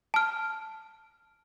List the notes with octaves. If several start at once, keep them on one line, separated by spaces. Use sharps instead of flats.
A5 F6